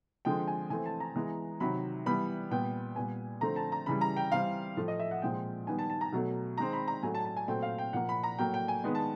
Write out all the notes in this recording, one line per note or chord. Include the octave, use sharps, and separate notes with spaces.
D3 F3 G#3 C4 G5
G#5
E3 A3 C4 G#5
A5
A#5
E3 G#3 B3
C3 D#3 F#3 B5
E3 G3 B3 B5
A#2 G3 B3 G5
A#2 G3 B3 G#5
D3 F3 A3 C4 A#5
A5
A#5
C#3 E3 G3 B5
A#5
G5
E3 G3 C4 F5
A2 F3 A3
D#5
E5
F#5
A#2 F3 G#3 C4 G5
D#3 G3 B3 G#5
A5
A5
A#5
B2 F#3 A3
D#3 G#3 C4 A#5
B5
A#5
A2 F#3 A3 G#5
A5
A5
G#5
A#2 F#3 A3 C4 G5
F5
G5
A#2 F3 A#3 F#5
B5
A#5
A2 F#3 A#3 G5
G5
G#5
D#3 G#3 B3
A5